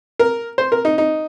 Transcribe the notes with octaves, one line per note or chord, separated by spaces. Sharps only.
A#4
C5
A#4
D#4
D#4